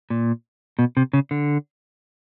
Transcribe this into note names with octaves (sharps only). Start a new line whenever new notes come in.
A#2
B2
C3
C#3
D3